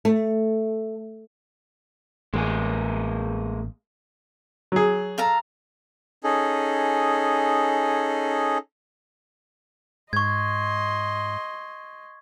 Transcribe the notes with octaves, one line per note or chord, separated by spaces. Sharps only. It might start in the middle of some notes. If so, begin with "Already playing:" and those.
A3
A1 G#3 A#3 G#4
F#3 G#4
A4 F5 A#5
C#4 D#4 G#4 A4
G#2 D#5 C6 C#6 G#6